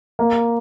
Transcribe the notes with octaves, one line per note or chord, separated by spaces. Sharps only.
A#3